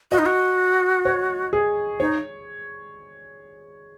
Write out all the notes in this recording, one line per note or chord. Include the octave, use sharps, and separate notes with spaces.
F#4 D#5
D#4
F#4
C#5
G#4
D#4 C#5